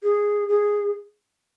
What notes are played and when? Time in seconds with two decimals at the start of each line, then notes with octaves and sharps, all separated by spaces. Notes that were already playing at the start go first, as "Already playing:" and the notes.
0.03 G#4
0.49 G#4